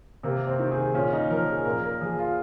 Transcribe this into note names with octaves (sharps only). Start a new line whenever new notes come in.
C3 A#3
C4
D#3
G#4
A#2 C#4
D#4
F3 A#4
G#4
A#2 A#4
A#4
F3 G#4
F4